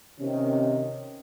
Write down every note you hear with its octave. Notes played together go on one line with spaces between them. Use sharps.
C3 D#3 C#4